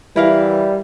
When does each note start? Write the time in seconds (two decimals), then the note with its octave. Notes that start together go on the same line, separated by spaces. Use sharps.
0.16 E3 G3 E4 A#4 F5